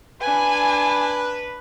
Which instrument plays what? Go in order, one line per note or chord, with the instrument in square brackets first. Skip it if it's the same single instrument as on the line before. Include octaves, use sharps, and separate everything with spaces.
[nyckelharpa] D4 B5 [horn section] B4 [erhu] G#5